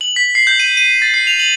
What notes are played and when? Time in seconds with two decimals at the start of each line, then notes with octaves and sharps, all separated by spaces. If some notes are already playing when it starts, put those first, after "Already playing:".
0.01 F#7
0.16 B6
0.35 C7
0.47 G6
0.59 D#7
0.77 D#7
1.02 A6
1.14 C7
1.27 F7
1.39 F#7